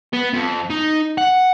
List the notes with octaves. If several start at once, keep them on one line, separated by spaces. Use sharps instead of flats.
B3
F2
D#4
F#5